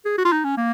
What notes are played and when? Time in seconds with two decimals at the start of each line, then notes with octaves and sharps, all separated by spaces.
0.05 G#4
0.18 F#4
0.25 F4
0.32 D#4
0.44 C#4
0.57 A#3